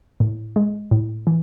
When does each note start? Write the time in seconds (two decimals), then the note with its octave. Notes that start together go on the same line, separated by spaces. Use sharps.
0.20 A2
0.56 G#3
0.91 A2
1.27 E3